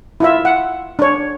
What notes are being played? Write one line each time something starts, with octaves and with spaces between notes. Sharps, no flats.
E4 F4 E5
F#5
D4 C#5